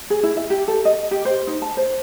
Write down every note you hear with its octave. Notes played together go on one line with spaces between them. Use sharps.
G#4
E4
E5
G4
A4
D#5
G4
C5
D#4
A5
C5